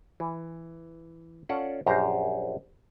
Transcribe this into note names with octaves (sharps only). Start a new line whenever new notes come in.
E3
C#4 F4 A4 D5 F#5
A#1 F#2 G4 C5 A#5